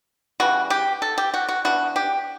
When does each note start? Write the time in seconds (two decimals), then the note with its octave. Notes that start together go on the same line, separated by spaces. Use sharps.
0.40 C#3 E3 G3 F#4
0.70 G4
1.02 A4
1.18 G4
1.34 F#4
1.49 F#4
1.65 E3 B3 D4 F#4
1.96 G4